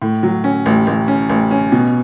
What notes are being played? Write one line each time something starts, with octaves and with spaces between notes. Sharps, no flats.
A2
F#3
C#4
A1
A1
C#4
A1
C#4
B2